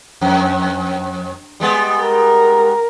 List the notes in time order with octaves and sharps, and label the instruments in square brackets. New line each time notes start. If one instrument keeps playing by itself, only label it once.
[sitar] F2
G3 G#3 B3
[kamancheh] A#4